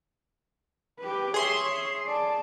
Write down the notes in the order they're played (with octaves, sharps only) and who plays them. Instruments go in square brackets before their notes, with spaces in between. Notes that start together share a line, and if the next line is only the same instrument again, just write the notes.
[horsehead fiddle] G4 B4
[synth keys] G#4 C6 [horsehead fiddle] C#5 E5
[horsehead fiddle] D5 A5